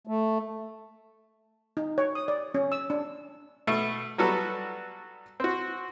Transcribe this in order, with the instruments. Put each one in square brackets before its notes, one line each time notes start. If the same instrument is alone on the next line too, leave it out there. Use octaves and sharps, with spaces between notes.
[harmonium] A3
[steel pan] D#4
C#5
D#6
D5
C#4
E6
D4
[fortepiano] B2 A3
F#3 G3 B3 F#4 A4
C4 F#4